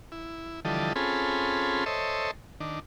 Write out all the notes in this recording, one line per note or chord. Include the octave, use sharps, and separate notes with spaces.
E4
D3 E3 F3 G3 A4 D#5
C4 C#4 F4 G#4 A4 B5
A4 C5 C#5 D#5 E5
D#3 D4